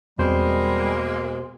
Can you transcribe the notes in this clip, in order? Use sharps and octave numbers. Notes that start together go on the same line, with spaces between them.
E2 B2 G3 G#3 A#3 C4 C5